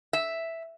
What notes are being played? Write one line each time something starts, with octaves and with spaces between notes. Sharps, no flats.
E5